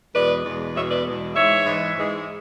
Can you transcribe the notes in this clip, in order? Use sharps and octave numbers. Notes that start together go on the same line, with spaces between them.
E2 B2 G#3 B4 D5
E2 B2 G#3
E2 B2 G#3 C#5 E5
B4 D5
E2 B2 G#3
G#2 E3 G#3 C#5 E5
G#2 E3 G#3
G#2 E3 G#3